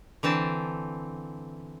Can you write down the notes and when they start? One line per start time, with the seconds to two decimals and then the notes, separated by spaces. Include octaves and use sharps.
0.23 D3 E3 C4 A5